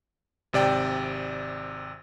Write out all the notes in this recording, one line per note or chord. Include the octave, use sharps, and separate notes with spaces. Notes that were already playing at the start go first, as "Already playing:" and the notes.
G#1 C3 D5 G5